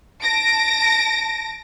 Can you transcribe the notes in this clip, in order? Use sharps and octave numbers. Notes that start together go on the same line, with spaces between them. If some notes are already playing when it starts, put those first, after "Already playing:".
A5 A#6 D7